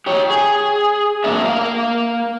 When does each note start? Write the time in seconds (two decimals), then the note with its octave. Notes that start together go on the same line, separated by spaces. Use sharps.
0.06 G4 C#5
0.30 G#4
1.24 B2 A#3 D4 A#4 E5
1.41 A#3 F5